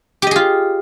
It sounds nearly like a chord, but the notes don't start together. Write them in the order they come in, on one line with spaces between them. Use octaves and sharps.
G4 D#5 G#4 F4